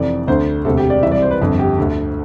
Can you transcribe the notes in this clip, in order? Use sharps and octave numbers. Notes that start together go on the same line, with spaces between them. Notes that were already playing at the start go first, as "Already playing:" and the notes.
Already playing: F1 F2 E3 D5
D2 D3 C5
E1 D2 C3 A4
G4
D5
C2 C3 E3 E5
D5
C5
B4
G1 F2 D3
G4
D2 D3